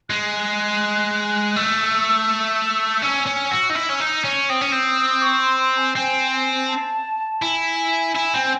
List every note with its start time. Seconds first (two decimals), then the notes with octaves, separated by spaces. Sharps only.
0.09 G#3 F#6
1.56 A3 E6
3.03 C#4 E6
3.27 C#4
3.52 F#4
3.70 D#4
3.76 E4
3.90 C#4
4.00 D#4
4.24 C#4
4.49 C4 D#6
4.61 C#4
4.72 C4
5.22 C#6
5.41 C6
5.59 C6
5.78 G#5
5.96 C4 G#5
6.32 G#5
6.69 A5
7.42 E4 G#5
8.16 E4
8.34 C4